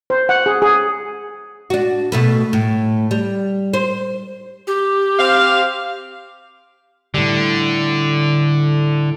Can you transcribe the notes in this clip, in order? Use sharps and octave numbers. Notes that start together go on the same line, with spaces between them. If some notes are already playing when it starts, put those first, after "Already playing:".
C5
F#5
G#4
G#4
D4 F#4
B2 A3 B4
A2
G3
C5
G4
C4 F5
A2 D3 G3